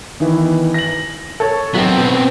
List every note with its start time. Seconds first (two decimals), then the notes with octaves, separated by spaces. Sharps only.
0.20 D#3 E3 B3
0.74 A#6 F#7
1.40 A4 C#5
1.74 B1 F#3 B3 C4
1.98 B2